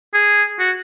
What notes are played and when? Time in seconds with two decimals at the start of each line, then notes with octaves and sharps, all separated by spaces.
0.14 G#4
0.59 F#4